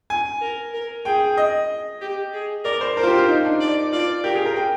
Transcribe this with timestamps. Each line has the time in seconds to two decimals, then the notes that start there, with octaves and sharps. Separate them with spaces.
0.10 G#5
0.41 A#4
0.74 A#4
1.05 G#4 G5
1.37 D#5
2.02 G4
2.33 G#4
2.64 A#4 D5
2.81 C5
2.97 A#4 C5
3.03 F4
3.07 G4
3.18 F4
3.28 D#4
3.45 D4
3.60 D5
3.93 F4 D5
4.24 G4 A#4
4.35 G#4
4.45 A#4
4.56 G5